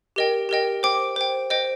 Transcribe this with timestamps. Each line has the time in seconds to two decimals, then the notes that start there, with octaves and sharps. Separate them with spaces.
0.16 G4 A#4 D#5 G5
0.49 G4 A#4 D#5 G5
0.83 C5 G5 D6
1.16 C5 G5
1.50 C5 D#5 G5